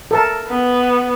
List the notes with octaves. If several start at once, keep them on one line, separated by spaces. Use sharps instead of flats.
A4 A#4 A5
B3